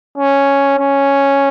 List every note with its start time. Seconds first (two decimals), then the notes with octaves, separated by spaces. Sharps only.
0.18 C#4
0.78 C#4